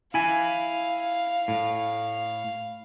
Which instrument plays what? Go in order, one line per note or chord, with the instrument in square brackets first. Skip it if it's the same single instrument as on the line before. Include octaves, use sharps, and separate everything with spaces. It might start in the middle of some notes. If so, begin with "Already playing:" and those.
[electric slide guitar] E4 G#5 [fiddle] F5
[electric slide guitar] A2